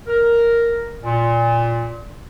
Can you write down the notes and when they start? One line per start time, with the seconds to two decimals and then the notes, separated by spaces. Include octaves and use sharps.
0.07 A#4
1.03 A#2